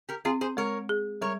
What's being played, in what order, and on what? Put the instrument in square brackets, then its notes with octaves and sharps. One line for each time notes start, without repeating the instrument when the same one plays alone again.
[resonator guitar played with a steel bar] G4 A#4
[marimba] C4 [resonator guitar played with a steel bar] F4 G#4
[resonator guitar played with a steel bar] G#4 C5
[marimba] G#3 [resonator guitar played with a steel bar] A#4 C#5
[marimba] G#4
[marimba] G3 [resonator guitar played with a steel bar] A#4 C#5